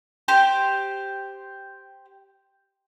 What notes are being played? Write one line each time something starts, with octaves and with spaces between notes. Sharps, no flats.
G4 C5 G5